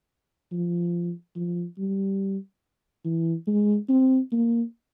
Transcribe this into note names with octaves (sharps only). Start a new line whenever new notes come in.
F3
F3
G3
E3
G#3
C4
A#3